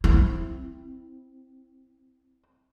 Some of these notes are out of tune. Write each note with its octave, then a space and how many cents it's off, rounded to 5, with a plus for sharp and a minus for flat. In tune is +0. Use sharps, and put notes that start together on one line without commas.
C4 +0 E4 +0